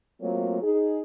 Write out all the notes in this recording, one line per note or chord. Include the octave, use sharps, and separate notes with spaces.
F#3 A3 A#3 C4 F4
D#4 G#4